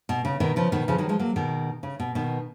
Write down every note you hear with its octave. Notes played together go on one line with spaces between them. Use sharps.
B2
C#3
B2 D#3
C#3 F3
B2 D#3
C#3 F3
D#3 F#3
F3 G#3
F#3 A#3
B2 D#3
C#3
B2
B2 D#3